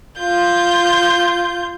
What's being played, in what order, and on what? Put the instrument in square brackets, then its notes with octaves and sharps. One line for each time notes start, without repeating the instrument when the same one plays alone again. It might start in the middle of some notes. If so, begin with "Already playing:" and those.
[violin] F4 G6